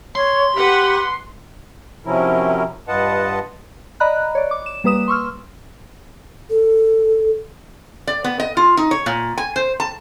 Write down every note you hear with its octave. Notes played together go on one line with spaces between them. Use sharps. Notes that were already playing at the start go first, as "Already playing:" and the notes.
C#5 C6
G4 B4 F#5 B5
C3 F3 F#3 C#4 E4 A#4
G2 F4 B4 D#5 F#5 A5
D5 D#5 A#5 B5 F#6
C#5 D5
D6
E7
G3 A#3 B4 D#6 E7
C6 C#6 E6 F6
A4
D5
B3
D#5
F4
D#4
C#5
A#2
G#5
C5
A5